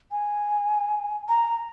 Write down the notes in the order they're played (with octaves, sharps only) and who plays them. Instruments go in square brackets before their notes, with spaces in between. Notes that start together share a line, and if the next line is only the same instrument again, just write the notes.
[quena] G#5
A#5